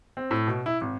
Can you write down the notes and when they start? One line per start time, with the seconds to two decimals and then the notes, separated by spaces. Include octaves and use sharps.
0.17 C4
0.31 A2
0.47 B2
0.66 E4
0.81 G#1